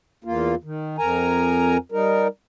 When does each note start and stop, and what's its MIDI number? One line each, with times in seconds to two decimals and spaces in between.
0.24 0.55 40
0.24 0.55 58
0.24 0.55 65
0.64 0.97 51
0.99 1.77 41
0.99 1.77 70
0.99 1.77 80
0.99 1.77 82
1.92 2.28 55
1.92 2.28 63
1.92 2.28 70